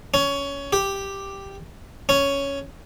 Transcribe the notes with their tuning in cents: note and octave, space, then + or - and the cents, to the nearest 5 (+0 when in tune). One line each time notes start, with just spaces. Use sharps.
C#4 +15
G4 +0
C#4 +5